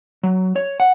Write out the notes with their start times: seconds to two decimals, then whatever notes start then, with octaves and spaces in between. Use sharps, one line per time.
0.23 F#3
0.56 C#5
0.80 F#5